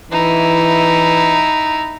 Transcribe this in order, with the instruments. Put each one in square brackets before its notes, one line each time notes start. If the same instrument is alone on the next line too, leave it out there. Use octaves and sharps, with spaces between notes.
[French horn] E3 [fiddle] D#4 E4